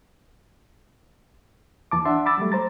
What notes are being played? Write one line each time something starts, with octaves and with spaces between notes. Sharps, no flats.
D#2 E3 A5 D6
D4 E5 F#5 A5 C6
B5 D6 E6 A6
F#3 G3 A3
C5 A#5 A6